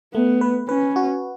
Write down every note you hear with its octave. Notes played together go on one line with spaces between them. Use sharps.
A3 B3
B4
C#4 B4
F#4